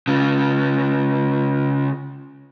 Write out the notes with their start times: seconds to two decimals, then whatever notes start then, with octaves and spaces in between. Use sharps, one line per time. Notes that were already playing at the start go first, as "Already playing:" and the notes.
0.08 C#3 F4